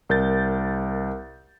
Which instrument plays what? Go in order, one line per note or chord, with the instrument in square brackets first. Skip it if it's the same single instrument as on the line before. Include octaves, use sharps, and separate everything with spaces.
[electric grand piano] C2 A#4 G6 A6